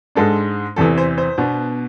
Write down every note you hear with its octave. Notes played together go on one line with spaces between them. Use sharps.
G#2 G#3 D4 A4
E2 C3 E3 A4
C5
C5
B2 B3 D4